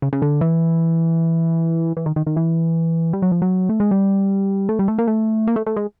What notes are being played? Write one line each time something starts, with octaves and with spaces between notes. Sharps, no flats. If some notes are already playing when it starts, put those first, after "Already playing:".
C#3
C#3
D3
E3
E3
D#3
D#3
D#3
E3
G3
F#3
F3
F#3
A3
G#3
G3
A3
G3
A3
A#3
A3
A#3
A3
A3
G#3